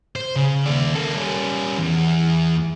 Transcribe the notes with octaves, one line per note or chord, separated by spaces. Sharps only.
C5
C#3
D#2 D5
A#3 A4
G3 C#4
E2